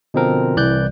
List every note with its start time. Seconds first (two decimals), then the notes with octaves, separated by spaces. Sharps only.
0.14 B2 D3 F3 C4 A#4
0.56 C2 E3 D5 F#6 G6